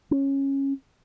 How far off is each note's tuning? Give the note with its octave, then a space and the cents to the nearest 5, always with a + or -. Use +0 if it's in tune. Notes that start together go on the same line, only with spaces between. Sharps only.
C#4 -15